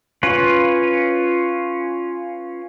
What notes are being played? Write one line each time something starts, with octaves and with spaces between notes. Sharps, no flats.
C#4 F4 B4